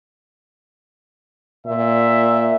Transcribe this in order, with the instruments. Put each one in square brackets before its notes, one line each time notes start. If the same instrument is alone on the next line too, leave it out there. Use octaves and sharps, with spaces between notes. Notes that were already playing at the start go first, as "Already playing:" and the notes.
[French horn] A#2 [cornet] E5